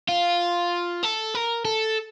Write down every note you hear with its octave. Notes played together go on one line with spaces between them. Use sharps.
F4
A4
A#4
A4